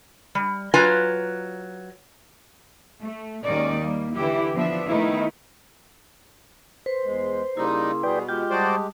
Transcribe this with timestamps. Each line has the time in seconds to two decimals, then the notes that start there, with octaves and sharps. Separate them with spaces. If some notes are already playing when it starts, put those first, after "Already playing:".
0.35 G3
0.74 F#3 F4 B4 G#5 A#5
3.01 A3
3.43 D#2 D#3 G#3 C#4 D#4 D5
3.78 G3 A#3
4.15 D3 E3 E4 G4
4.54 F3 B3 D4 E5
4.88 D#3 A3 B3 D#4 E4
6.86 B4 C5
7.05 E2 G#3
7.57 C#3 G3 A#3 D#4 E4 C6
8.03 B2 G3 G#4 B4 D5 G5
8.29 G#3 F4 G4 G5
8.50 G3 F#4 C5 D5 A5 D#6